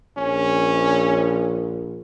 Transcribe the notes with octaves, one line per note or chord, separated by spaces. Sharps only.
A#1 C#4